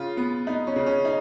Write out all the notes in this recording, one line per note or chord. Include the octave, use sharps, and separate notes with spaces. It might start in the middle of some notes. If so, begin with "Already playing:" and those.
Already playing: C#3 F4
B3
B3 D#4
C#4
C#3
C#4
D#4